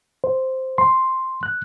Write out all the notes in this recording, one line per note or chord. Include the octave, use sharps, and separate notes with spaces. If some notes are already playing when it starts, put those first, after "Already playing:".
C5
C6
F#6